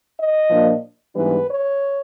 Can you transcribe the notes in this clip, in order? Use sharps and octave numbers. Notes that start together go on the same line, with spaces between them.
D#5
A#2 F3 A#3 D4
G#2 E3 G3 B3 D4 B4
C#5